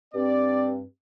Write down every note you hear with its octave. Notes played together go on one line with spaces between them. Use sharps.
G2 C4 D5